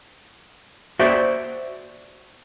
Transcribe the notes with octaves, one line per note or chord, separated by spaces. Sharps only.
F#4 C5 D5 E5